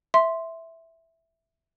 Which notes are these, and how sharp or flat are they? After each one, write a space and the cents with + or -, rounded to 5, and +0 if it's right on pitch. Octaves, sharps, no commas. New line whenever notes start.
E5 +0 C6 +0